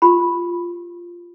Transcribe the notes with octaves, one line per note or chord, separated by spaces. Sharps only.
F4 G4 B5